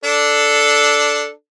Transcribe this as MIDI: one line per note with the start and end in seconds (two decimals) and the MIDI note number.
0.04 1.30 62
0.04 1.30 69